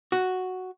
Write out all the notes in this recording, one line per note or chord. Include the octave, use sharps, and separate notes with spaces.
F#4